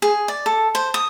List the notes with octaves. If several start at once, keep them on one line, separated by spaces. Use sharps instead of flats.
G#4
D5
A4
C5
D#6